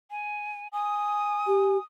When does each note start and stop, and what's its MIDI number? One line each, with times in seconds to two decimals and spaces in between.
0.11 0.68 80
0.73 1.80 80
0.73 1.84 87
1.47 1.77 67